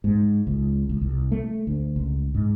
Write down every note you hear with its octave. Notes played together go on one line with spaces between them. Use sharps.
G#2
C#2
C#2
C2
A3
D2
C#2
G#2